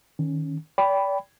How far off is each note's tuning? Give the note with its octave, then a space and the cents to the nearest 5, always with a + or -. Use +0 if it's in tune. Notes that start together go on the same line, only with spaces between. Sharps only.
D#3 +0 C#4 +0
D5 -35 G5 +0 B5 +0